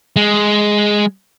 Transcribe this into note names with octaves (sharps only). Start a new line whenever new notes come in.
G#3